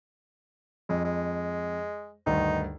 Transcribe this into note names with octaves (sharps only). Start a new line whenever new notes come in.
F2 G#3
G#3
D2 G2 D#3 D#4